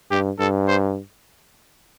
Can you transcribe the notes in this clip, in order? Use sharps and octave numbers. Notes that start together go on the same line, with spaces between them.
G2 G4
G2 A4
C5